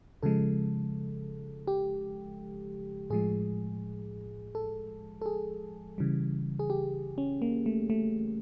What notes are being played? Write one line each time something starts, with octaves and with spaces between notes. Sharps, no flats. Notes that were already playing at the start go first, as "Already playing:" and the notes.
C#3 F3 G#3 A4
G4
A2 F3 G#3 G#4
A4
A4
G#4
C#3 E3 G3
G#4
G4
C#4
A#3
A3
A3